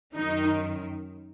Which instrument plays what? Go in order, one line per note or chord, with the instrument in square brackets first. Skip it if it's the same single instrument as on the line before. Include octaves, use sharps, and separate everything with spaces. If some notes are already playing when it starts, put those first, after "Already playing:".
[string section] F#2 D#3 D#4